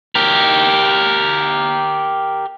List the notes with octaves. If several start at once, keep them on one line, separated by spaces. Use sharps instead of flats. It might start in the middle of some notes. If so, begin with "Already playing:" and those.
G4 A#4